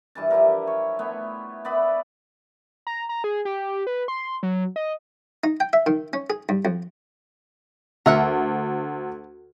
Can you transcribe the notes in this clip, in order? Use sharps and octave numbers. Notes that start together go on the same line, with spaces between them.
G2 E3 A5
F3 E4 G4 A#4
C#5
A3 B3 C#5
B3 D5 E5 B5
A#5
A#5
G#4
G4
B4
C6
F#3
D#5
D#4
G5
E5
D#3
C#4
G#4
G2
F2
D2 A#4 E5 F#5